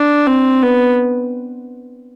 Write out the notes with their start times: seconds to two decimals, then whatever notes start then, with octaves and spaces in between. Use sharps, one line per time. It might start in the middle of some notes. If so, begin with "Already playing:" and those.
Already playing: D4
0.27 C4
0.63 B3